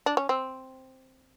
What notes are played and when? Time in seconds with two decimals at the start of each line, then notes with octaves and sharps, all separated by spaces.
0.06 D4
0.17 C#4
0.29 C4